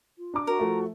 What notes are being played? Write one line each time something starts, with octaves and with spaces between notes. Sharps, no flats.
F4
D4 A#5 D6
F#4 A#4
F3 A3